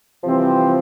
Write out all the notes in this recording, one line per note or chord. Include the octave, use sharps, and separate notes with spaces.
C3 E3 F3 G3 C4 G4